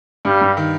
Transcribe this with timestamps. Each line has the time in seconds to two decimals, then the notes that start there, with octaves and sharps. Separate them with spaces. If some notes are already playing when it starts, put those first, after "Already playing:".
0.25 G2 G3
0.41 G2
0.57 D#3